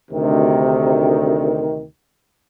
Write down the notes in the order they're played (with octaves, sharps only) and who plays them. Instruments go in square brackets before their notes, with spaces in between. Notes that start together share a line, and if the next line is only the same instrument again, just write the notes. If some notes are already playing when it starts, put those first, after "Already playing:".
[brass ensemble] D2 C3 D#3